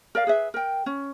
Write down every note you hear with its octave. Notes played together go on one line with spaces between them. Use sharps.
A#4 D5 F5
G#4 B4 E5
A#4 G5
C#4